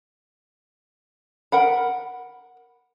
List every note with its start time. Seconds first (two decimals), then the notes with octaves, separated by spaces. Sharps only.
1.52 A#4 F#5 B5